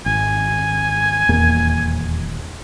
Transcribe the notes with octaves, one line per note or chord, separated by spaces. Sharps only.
G#1 G#5
D#1 E2 A#3